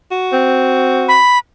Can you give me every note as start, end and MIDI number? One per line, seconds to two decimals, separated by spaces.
0.11 1.19 66
0.32 1.20 60
1.08 1.38 83